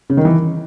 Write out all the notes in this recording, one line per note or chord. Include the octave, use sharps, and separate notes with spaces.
C#3
D#3
E3